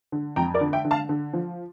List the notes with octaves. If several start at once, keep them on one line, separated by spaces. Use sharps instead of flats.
D3
F2 G5 A#5
A#4 D5
D3
E5 G5
D3
F5 A5
D3
F3